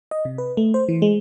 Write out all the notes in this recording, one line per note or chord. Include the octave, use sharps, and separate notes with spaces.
D#5
C3
B4
A3
C5
E3
G#3